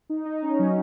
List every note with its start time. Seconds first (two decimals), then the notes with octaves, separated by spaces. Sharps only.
0.10 D#4
0.26 D#4
0.42 C#4
0.59 F#3